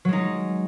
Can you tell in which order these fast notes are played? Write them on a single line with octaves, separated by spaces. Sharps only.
F#3 G#3 D#4